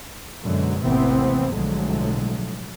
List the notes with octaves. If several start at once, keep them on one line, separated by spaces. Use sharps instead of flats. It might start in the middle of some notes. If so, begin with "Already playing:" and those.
F#2 B2 D3 F#3 G#3
A1 D#2 C3 E3 B3 C4
B1 A2 D3 F3 F#3 G#3